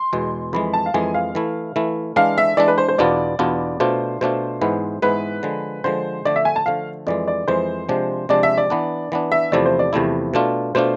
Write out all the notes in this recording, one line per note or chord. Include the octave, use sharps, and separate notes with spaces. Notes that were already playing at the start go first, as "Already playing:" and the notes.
Already playing: C6
E2 B2 G#3
F2 E3 G#3 B5
A5
F5
F2 E3 G#3 G#5
F5
E3 A3 E4
E3 A3 E4
E3 G#3 D4 F5
E5
E3 G#3 D4 D5
B4
C5
C5
E2 B2 B3 D4 F4 D5
E2 B2 B3 D4 F4
B2 A3 D4 F4 C5
B2 A3 D4 F4 C5
G#2 E3 G#3 B3 E4
G#2 E3 G#3 B3 E4 B4
D3 F3 G#3
D3 F3 G#3 C5
D3 F3 A3 D5
E5
G#5
A5
D3 F3 A3 F5
F2 E3 G#3 D5
D5
F2 E3 G#3 C5
C3 F3 G#3 D4
C3 F3 G#3 D4 D5
E5
D5
E3 B3 D4
E3 B3 D4
E5
E2 C3 F3 A3 E4 D5
C5
D5
E2 C3 F3 A3 E4
B2 A3 D4 F4
B2 A3 D4 F4 C5